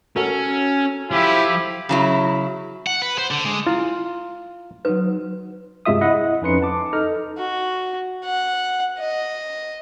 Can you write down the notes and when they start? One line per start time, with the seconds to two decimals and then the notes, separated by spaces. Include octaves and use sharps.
0.16 C#4 F#4 A4 A#4
1.11 F3 E4 F4 G4
1.89 C#3 F#3 E4
2.87 F#5
3.02 B4
3.18 C5
3.31 D3
3.45 G#3
3.67 E4 F4
4.85 F#3 C4 D#4 B4
5.85 G2 C3 G#3 F4 E5 D#6
6.01 E4 D#5 F#5
6.42 F2 C#4 D#4 B4 C6 C#7
6.62 A5 D6
6.93 D#4 A4 A#5 F6
7.38 F#4
8.25 F#5
8.99 D#5